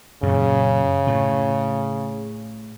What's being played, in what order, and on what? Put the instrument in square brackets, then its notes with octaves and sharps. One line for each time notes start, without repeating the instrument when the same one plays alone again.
[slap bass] F#2 A#2 [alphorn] C#3
[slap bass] A2